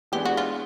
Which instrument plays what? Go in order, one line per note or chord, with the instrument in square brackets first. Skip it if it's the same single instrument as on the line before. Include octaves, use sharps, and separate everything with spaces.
[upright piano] E3 G#3 B3 D4 [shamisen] G4
[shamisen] F#4
F4